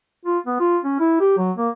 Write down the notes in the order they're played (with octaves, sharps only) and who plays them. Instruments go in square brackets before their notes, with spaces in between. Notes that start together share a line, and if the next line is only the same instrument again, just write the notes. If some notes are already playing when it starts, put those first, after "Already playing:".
[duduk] F4
B3
F4
C#4
E4
G4
F#3
A#3